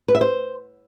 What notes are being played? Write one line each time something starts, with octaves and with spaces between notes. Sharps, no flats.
B4
E5
C5